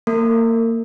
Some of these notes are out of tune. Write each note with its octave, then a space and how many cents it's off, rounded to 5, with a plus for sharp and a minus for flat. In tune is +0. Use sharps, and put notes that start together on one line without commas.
A#3 -25 A#4 -40